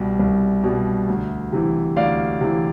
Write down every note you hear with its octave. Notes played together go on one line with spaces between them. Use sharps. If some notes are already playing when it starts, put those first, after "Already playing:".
Already playing: C2 B2 G3
C2
B2 G3
D2
C3 E3
D2 D5 F5
C3 E3